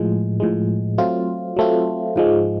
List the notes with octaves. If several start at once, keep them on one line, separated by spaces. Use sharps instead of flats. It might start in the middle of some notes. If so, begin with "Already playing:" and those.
Already playing: A2 F3 G#3
A2 F3 G#3
F#3 A3 C4 F4
F#3 A3 C4 F4
G#2 F3 G#3